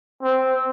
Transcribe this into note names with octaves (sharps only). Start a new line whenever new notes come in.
C4